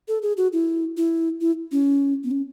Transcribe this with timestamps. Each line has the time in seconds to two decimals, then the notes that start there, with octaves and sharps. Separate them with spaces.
0.08 A4
0.22 G#4
0.37 F#4
0.53 E4
0.97 E4
1.41 E4
1.72 C#4
2.24 B3
2.31 C#4